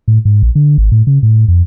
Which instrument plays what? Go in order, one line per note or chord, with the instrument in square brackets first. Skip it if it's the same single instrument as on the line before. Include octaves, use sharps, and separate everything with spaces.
[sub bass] A2
G#2
A#1
D3
G#1
A2
C#3
A2
F2